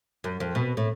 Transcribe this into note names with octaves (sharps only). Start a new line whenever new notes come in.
F#2
F2
B2
A2